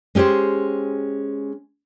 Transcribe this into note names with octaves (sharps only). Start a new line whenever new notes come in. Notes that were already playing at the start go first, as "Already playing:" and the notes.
G#3 C#4 G4 G#4 C5